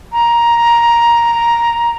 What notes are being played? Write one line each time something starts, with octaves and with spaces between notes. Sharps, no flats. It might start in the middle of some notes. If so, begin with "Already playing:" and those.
A#5